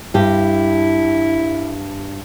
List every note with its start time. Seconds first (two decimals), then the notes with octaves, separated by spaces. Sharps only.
0.14 G2 E4 G4